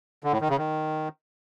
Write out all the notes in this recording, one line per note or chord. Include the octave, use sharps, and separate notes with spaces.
D3
A2
D#3
C#3
D#3